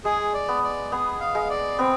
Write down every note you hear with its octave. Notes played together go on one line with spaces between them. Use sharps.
G#3 G#4
D5
B3
D5
B3 G#4
F5
G#3
D5
B3 C4